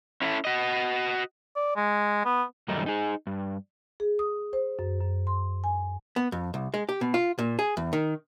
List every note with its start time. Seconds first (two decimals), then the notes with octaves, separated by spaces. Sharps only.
0.22 C#4 E4 A4
0.45 F#4 D#5
1.56 D5
1.76 G#3
2.25 B3
2.68 F#2 A2 D#3 G3 A3 D#4
2.86 D#4 G#4
3.27 G2
4.00 G#4
4.19 D#6
4.53 C5
4.79 F#2
5.01 F#2
5.27 C6
5.64 G#5
6.16 B3
6.32 F2
6.54 C2
6.74 G#3
6.89 G4
7.01 B2
7.14 F4
7.39 A#2
7.59 G#4
7.77 E2
7.93 D#3